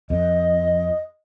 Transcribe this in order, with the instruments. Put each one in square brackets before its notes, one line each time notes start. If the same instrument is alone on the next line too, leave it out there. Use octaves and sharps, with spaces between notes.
[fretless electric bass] F2 [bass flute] D#5